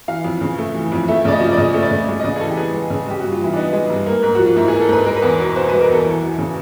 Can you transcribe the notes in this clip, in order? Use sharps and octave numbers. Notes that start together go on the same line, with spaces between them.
E3 F5
F2
C#3
A3
E3
F2
A3 E5
C#3 D5
D#5
F3
D5
C#3 D#5
A3
D5
C#3
G#3
D#5
C#3 D5
G#4
E3 A4
G4
B3 G#4
G#3
C#3
G#3 G4
G2 F#4
F4
E3 E4
D4
B3 D#4
G#3
G2
A#3
G#2
F3 F#4
F4
G#2 E4
G#4
A#3
A4
G#2 B4
G#3 A#4
B4
E2
B2
B3 C5
G#3 B4
A#4
E2 A4
E3
F#2
C#3